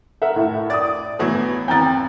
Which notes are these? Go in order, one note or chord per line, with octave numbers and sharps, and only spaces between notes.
A#4 E5 F#5
A2
D5 D#6 A6
A2 E3 F#3 B3
F2 E3 G5 A#5 A6